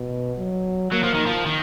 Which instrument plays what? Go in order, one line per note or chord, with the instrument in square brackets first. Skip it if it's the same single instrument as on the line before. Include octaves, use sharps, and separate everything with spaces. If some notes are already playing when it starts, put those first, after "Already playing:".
Already playing: [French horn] B2
F#3
[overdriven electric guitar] F#3 [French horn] A#3
[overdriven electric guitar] F3
D#3
F3
D#3